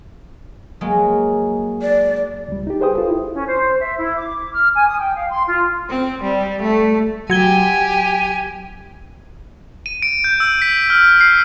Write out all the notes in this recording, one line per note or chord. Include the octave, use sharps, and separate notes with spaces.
F#3 G#3 A#3
D5
C#2 G3
D#4 G4
G#4 B4 C5 G5 D#6
F4 A4
E4
C#4
C5
E5
E4
D6
F6
G#5
D#6
G5
F5
C6
F4
C4
G3
A3
F#3 G4 G#5 G#6 G7
D#7
D7
G6
E6
B6
F6
C7